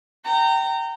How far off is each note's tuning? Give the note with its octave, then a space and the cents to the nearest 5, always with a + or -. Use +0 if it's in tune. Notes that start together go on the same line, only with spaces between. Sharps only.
G5 -25 A#5 -25